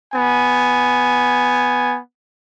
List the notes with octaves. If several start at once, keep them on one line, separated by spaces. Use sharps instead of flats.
B3 G#5